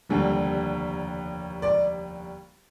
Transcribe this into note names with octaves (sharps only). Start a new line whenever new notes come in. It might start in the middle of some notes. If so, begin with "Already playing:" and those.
F1 D#2 D3 G3
D5